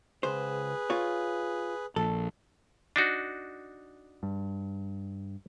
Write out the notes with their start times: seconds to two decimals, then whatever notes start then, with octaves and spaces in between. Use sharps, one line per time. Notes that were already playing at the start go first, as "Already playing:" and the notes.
0.23 C#2 G#4 B4 C5
0.90 F4 C#5
1.96 A#1 A4
2.96 D4 D#4 F#4
4.23 G2